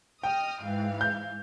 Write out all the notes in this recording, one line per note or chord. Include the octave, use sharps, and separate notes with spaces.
D#5 G5 D#6 F6
G#2 E3 F5
G6